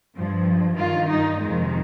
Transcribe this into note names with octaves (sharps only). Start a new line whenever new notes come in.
G2 F3
G2 D#3 F4
D#4
F2 C3 D#3 G#3